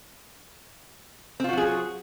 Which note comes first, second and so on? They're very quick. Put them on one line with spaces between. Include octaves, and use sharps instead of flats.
C4 F4 F#4 F#3 G#4